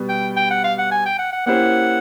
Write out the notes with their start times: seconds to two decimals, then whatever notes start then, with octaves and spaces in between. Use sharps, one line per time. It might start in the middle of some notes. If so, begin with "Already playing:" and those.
Already playing: B2 G3 B3
0.09 G5
0.37 G5
0.51 F#5
0.64 F5
0.78 F#5
0.91 G#5
1.06 G5
1.19 F#5
1.32 F#5
1.46 A#3 C#4 E4 G4 C5 F#5